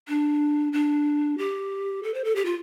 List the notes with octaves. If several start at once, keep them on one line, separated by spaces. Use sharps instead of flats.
D4
D4
G4
A4
C5
A4
G4
F4